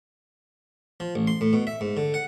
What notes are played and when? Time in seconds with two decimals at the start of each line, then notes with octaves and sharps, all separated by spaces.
1.00 F3
1.15 A1
1.27 C6
1.41 A2
1.53 B2
1.67 E5
1.81 G#2
1.97 D3
2.14 F#5